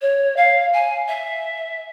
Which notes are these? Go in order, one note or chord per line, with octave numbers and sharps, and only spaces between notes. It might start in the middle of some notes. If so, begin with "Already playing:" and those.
C#5
F5
G#5
E5